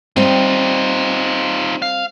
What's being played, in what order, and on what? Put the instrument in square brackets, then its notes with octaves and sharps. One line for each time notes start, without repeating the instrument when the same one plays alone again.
[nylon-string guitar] G3 C4 [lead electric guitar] D#4 F4
[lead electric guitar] F5